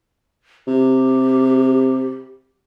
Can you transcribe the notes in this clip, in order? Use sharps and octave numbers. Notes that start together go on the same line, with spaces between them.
C3 G4